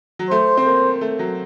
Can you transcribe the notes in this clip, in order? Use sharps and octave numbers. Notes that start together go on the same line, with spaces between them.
F#3
A3 C5
C4
A#3
A3
F#3